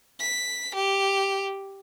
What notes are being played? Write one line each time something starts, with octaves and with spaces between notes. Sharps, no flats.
B6
G4